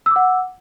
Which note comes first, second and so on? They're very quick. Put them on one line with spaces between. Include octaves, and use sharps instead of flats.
E6 D6 F#5